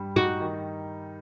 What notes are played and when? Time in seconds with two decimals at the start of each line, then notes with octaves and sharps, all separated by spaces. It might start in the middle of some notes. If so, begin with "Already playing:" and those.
Already playing: G2 G3
0.16 D#4 F#4
0.41 D#3